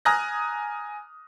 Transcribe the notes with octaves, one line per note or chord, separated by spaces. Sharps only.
G#5 A#5 D#6 F6 F#6 A#6